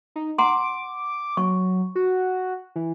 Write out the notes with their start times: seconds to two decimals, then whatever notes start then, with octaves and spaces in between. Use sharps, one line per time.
0.16 D#4
0.38 F#5 A#5 C6 D6
1.37 F#3 C#6
1.95 F#4
2.76 E3